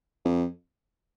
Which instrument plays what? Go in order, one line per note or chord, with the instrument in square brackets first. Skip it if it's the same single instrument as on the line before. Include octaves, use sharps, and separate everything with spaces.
[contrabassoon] F2